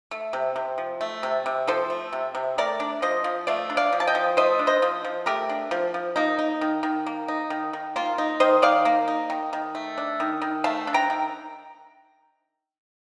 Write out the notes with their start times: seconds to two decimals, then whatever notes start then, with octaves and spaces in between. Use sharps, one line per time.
0.11 A3
0.33 C3
0.56 C3
0.78 F3
1.01 A3
1.23 C3
1.46 C3
1.67 F3 A4 C5
1.90 A3
2.13 C3
2.35 C3
2.58 A3 A#4 D5
2.80 D4
3.02 F3 C5 D#5
3.24 F3
3.47 A3 D5 F5
3.70 D4
3.77 D5 F5
3.93 F3
4.00 A5
4.07 D#5 G5
4.15 F3
4.37 A3 C5 D#5
4.59 D4
4.67 C5 D#5
4.82 F3
5.05 F3
5.26 A3 G4 A#4
5.49 D4
5.71 F3
5.94 F3
6.16 A#3 D#4
6.39 D#4
6.61 D#3
6.83 D#3
7.07 A#3
7.28 D#4
7.50 D#3
7.73 D#3
7.96 A#3 F4
8.18 D#4
8.40 D#3 C5 D#5
8.62 D#3 D5 F5
8.85 A#3
9.08 D#4
9.30 D#3
9.53 D#3
9.75 A3
9.98 D4
10.20 D#3
10.42 D#3
10.64 A3 F5 A5
10.87 D4
10.94 G5 A#5
11.10 D#3